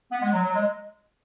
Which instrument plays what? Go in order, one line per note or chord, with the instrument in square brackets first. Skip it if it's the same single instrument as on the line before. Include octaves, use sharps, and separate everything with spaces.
[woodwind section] B3
G#3
F#3
F#3
G#3